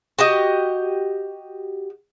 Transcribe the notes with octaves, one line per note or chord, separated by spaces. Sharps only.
F#4 G4 D#5